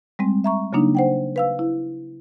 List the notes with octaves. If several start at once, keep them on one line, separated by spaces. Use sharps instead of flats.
G3 G#3 C4
E5 A#5 C#6
C#3 F#3 A#3 D4 D#4
C5 F#5 G5
B4 F5 E6
E4